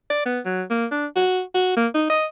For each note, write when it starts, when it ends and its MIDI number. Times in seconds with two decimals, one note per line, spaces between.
0.10 0.22 74
0.26 0.40 59
0.45 0.63 54
0.70 0.86 58
0.91 1.06 62
1.16 1.41 66
1.54 1.75 66
1.77 1.88 58
1.95 2.06 63
2.10 2.26 75